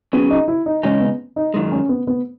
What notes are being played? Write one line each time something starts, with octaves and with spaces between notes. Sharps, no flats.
F#3 B3 C#4 G#4
D#4
E4
D#4
E2 C#3 G#3 C#4 D#4
B3
D#4
F#2 D#3 G#3 D#4
C#4
B3
B3